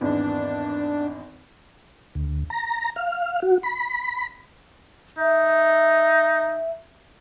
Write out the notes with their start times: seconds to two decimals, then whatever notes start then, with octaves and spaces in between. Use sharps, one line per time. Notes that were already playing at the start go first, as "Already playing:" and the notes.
0.01 G#1 E2 D4
2.15 D2
2.50 A#5
2.96 F5
3.42 F#4
3.63 B5
5.18 D#4 E5